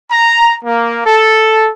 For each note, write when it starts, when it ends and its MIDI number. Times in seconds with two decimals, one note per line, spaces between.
0.12 0.56 82
0.64 1.00 58
1.06 1.70 69